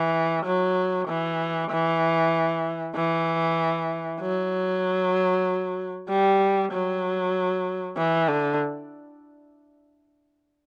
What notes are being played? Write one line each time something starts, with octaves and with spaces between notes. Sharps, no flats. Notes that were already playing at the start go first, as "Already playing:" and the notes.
Already playing: E3
F#3
E3
E3
E3
F#3
G3
F#3
E3
D3